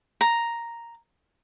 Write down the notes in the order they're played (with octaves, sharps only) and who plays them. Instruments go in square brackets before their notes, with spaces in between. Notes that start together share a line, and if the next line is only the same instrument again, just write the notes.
[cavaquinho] A#5